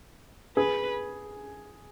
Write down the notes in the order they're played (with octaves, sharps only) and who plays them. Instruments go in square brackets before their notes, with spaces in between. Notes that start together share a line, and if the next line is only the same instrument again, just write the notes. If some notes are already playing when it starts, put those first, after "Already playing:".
[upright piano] G#4 [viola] B4